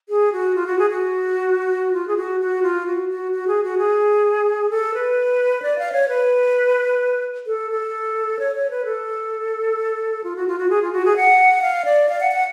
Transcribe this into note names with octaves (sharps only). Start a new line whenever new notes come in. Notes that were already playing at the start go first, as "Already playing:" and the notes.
G#4
F#4
F4
F#4
G#4
F#4
F4
G#4
F#4
F#4
F4
F#4
F#4
F#4
G#4
F#4
G#4
A4
B4
D5
F5
C#5
B4
A4
A4
C#5
C#5
B4
A4
F4
F#4
F4
F#4
G#4
F4
F#4
G#4
F#5
F5
D5
F5
F#5
F#5